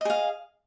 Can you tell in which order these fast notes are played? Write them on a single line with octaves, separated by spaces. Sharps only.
D#5 G#4 F5